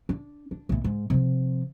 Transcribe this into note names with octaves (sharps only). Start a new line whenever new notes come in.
D4
D4
B1 A2
G#2
C3 F3